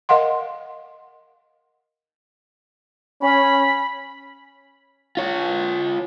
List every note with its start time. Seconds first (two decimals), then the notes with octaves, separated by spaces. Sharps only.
0.09 A#4 D#5 F5 F#5 C6
3.21 C#4 B5
5.17 F4 C#5